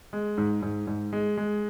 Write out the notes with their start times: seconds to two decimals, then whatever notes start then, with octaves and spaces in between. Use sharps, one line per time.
0.13 G#3
0.38 G#2
0.62 G#2
0.87 G#2
1.13 G#3
1.37 G#3